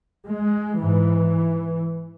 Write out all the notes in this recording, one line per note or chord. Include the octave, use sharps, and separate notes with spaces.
G#3
G#2 E3